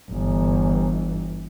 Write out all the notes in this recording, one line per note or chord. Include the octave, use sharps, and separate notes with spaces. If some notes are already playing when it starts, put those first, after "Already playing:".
G1 E3